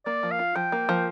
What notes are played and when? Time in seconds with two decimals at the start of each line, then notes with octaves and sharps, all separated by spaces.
0.06 A#3 D5
0.23 F3
0.31 F5
0.39 F4
0.56 F3 G5
0.72 A#3
0.89 F3